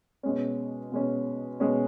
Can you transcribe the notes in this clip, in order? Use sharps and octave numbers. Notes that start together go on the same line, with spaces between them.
B2 G#3 C#4
B2 G#3 C#4
B2 G#3 C#4